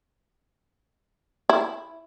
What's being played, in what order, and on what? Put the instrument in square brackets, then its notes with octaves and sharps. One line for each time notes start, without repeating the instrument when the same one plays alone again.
[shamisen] E4